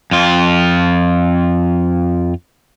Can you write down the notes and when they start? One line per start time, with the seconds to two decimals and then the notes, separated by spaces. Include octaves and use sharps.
0.11 F2 F4